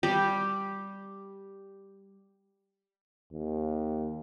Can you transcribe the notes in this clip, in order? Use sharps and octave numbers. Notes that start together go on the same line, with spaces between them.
G3 G4
D#2